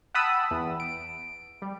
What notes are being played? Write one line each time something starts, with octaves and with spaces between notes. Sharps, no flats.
F#5 G5 A5 B5 D#6 E6
E2
D7
G3